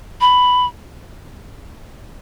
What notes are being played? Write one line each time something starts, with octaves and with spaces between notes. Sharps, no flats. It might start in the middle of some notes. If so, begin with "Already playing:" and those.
B5